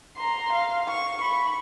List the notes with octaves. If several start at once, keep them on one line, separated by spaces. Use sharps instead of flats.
A#5 C6
F5
C#6
B5 C#6